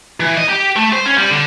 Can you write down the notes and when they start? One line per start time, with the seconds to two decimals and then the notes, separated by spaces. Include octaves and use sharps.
0.20 E3
0.38 D#5
0.49 G4
0.76 A3
0.93 C5
1.06 C#4
1.18 G3
1.31 D3